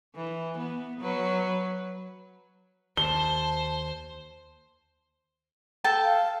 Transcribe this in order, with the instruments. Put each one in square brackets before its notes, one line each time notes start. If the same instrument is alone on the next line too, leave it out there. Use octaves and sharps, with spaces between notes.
[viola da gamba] E3
B3
F#3 B4
[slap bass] D#2 [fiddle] C5 [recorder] A5 [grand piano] G7
[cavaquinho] A4 G5 A5
[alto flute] F5